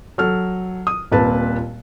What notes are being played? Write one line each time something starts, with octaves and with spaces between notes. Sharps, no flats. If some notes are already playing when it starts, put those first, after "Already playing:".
F#3 A4 F6
D#6
D#1 A#2 C4 B4 A5